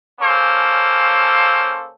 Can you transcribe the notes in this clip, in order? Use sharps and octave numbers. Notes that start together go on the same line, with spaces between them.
C#3 A#3 C#4 A4 C5